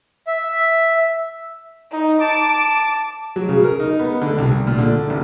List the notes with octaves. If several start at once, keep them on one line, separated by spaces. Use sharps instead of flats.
E5
D#4
A5 D6
F#3
C#3
A#4
D#4
B3
D3
C2
A#2
D3
A1